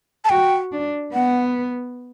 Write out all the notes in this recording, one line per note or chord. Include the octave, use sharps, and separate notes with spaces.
A5
F#4 G5
D4
B3 F#5